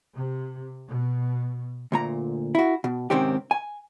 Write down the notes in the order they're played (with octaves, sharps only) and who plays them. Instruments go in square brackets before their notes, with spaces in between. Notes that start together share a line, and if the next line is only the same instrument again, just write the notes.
[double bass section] C3
B2
[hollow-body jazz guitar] D2 A#2 A#5
E4 F#4
B2
G#2 C3 D#3 C4 C#4 G4
G#5